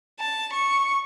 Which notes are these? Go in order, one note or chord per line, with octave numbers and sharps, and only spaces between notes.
A5
C#6